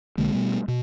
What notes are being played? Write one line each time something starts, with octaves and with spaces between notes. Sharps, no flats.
B1 D3 G#3 A#3
B2 G3 A3 B3
B2